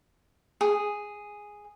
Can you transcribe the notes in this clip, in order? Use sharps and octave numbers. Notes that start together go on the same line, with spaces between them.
G#4